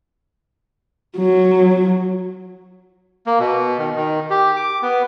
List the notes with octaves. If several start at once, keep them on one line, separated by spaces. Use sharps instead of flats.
F#3
A#3
B2
D#3
D#3
G4
D6
B3